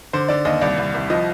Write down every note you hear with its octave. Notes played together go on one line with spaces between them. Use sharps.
D3 C5
D3 D5
D#2 D#5
C2 D5
C2
C2
F3 D#5